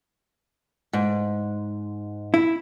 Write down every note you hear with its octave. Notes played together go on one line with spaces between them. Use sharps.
G#2
E4